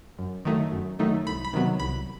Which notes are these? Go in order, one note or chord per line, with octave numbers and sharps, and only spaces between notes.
F#2
D#3 F#3 A3 D#4
F#2
D#3 F#3 A3 D#4
C2 B5
B5
C3 D#3 F#3 B3
C2 B5